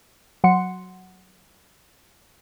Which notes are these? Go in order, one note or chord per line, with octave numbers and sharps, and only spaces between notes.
F#3 F#5 C6 C#7